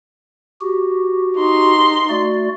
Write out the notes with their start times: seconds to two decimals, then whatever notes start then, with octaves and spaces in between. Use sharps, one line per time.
0.61 F#4 G4
1.38 D#4 C6
2.09 A3 F#4 D5